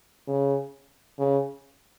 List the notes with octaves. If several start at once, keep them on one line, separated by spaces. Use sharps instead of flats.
C#3
C#3